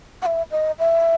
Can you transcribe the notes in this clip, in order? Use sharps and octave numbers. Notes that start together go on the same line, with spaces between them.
F#5
E5
D#5
E5